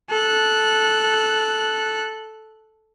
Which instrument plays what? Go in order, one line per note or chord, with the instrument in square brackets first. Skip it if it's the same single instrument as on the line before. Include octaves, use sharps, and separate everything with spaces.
[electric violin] A4 F#6